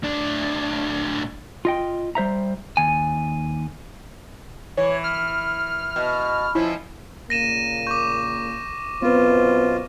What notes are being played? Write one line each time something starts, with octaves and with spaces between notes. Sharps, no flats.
A2 D4
F4 D#5 G5
G3 C5 E5 A#5
D#2 G#5
E3 C#5
F6
B2
B2 F3 C#4 E4
A#2 C#3 A#3 A#6 D#7 E7
C#6 D6 G6
F#2 B2 B3 C4 F4 B4 C5